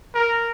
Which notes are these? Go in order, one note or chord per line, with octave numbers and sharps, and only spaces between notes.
A#4